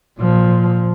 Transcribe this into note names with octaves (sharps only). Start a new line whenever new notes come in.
A#2 F3